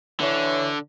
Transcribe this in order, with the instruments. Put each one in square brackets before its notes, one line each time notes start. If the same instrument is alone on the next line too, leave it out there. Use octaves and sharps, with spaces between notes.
[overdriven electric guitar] D3 [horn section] E3 C#5